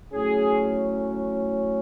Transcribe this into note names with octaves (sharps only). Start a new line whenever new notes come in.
A2 F#3 C#4 G#4